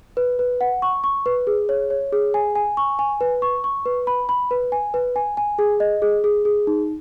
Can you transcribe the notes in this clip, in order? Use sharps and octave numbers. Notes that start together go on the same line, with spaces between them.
B4
B4
F#5
C#6
C#6
B4
G#4
C#5
C#5
G#4
G#5
G#5
C#6
G#5
B4
C#6
C#6
B4
B5
B5
B4
G#5
B4
G#5
G#5
G#4
D#5
G#4
G#4
G#4
D#4